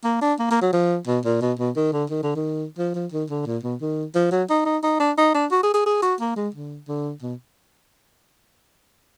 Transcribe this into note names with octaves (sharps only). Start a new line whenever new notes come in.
A#3
D4
A#3
A#3
F#3
F3
B2
A#2
B2
B2
D#3
D3
D#3
D3
D#3
F3
F3
D#3
D3
A#2
B2
D#3
F3
F#3
D#4
D#4
D#4
D4
D#4
D4
F#4
G#4
G#4
G#4
F#4
A#3
G#3
D3
D3
B2